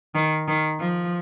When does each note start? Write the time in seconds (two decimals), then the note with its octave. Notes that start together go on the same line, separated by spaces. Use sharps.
0.15 D#3
0.48 D#3
0.79 F3